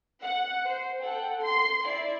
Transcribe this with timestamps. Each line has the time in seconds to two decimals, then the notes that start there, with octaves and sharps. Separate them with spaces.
0.23 F#5
0.65 C5
1.01 A4 F#5 G5
1.42 C6 C7
1.85 E4 D5